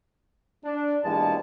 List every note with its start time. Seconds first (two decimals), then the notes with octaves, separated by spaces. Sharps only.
0.65 D4
1.03 B1 G2 A#2 E3 G#3 A5